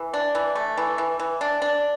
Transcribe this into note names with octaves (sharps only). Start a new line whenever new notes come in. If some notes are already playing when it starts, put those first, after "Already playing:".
Already playing: E3
D4
E3
A3
E3
E3
E3
D4
D4